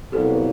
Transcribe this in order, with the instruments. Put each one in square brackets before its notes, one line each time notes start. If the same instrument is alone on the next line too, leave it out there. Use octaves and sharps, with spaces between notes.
[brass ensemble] C2 A#2 F#3 B3 [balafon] G4 A4